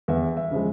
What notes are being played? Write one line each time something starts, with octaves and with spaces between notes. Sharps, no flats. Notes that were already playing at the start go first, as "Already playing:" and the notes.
E2 E5
E5
C#3 F3 G#3